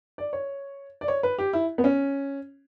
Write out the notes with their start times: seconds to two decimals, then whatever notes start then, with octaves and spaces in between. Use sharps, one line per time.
0.18 D5
0.33 C#5
1.01 D5
1.08 C#5
1.23 B4
1.38 G4
1.53 E4
1.78 B3
1.84 C#4